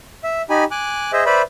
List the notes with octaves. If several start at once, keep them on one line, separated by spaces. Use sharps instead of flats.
E5
D#4 G4 G#5 B5
G#5 D6 F#6
G#4 C5 D#5 E5
B4 C5 D5 E5 B5